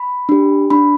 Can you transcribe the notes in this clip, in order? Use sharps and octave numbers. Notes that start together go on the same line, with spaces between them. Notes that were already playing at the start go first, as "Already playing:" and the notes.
Already playing: B5
D4 G4
D4 B5